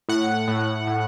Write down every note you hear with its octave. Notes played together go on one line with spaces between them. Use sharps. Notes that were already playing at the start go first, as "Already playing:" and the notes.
A2 F#5
A2
A2